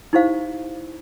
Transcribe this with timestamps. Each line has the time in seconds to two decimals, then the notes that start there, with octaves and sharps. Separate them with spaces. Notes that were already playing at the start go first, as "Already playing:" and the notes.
0.13 D#4 E4 G4 C5 F5